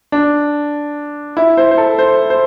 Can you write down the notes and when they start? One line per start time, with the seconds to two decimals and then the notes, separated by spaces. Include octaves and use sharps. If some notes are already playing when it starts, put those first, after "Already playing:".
0.12 D4
1.37 E4
1.57 C5
1.71 C5
1.78 A4
1.99 C5
2.30 C5